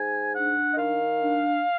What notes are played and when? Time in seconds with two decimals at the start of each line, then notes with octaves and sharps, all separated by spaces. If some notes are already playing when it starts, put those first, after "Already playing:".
Already playing: G#2 G#5
0.32 D4 F#5
0.72 D#5
0.77 D#3 F5
1.21 D4